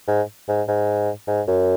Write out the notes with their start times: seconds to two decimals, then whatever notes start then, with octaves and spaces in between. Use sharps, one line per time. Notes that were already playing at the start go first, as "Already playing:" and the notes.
0.08 G#2
0.48 G#2
0.68 G#2
1.28 G#2
1.48 F#2